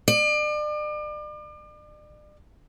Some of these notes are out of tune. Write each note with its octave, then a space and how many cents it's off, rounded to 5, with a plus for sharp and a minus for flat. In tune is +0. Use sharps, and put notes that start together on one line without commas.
D5 +40